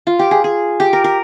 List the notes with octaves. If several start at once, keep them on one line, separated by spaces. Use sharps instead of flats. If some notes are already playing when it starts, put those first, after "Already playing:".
F4
G4
G#4
G#4
G4
A#4
A#4